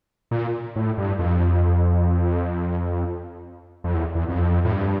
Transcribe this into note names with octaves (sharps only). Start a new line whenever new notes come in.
A#2
A2
G2
F2
F2
E2
E2
F2
A2
G2